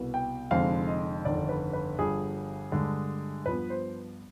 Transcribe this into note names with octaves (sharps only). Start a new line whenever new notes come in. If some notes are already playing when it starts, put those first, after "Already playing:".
Already playing: C2 B2 B3
G5
F1 F2 D3 G#3 C4 F5
D#5
G1 F2 D#3 D5
B4
B4
G1 G2 F3 G#4
G2 D3 G#3
G2 F3 B3 B4
C5